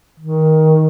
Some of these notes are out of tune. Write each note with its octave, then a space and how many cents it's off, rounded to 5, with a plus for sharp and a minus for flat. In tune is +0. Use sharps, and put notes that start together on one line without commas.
D#3 +15